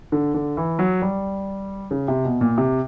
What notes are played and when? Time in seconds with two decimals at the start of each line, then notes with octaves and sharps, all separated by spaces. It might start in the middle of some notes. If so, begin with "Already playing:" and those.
0.12 D3
0.34 D3
0.57 E3
0.79 F#3
1.02 G3
1.91 C#3
2.08 C3
2.25 B2
2.41 A#2
2.58 C3